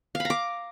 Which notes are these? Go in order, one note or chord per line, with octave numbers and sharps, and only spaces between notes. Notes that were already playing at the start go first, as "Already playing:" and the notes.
F5
B5
A#5
D6